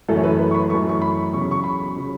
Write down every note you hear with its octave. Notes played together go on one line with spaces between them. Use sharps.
F#2 E3 A3 A4
C#5
B4
B4
C#6
B5
F#2 E3 A3 C#6
C#6
B5
E2 C#3 F#3 C#6
B5
C#6
B5
C#3 F#3